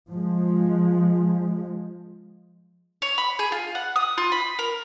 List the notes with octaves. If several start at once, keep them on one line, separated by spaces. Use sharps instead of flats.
F3 G#3
C#5
B5
G#4
F4
F#5
D#6
F4
B5
A#4